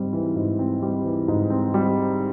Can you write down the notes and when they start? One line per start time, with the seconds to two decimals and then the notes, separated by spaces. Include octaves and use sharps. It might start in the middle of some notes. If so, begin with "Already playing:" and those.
Already playing: G#2 G3 C4
0.13 E3
0.36 G#2
0.59 C4
0.82 G3
1.04 E3
1.28 G#2
1.50 C4
1.74 G3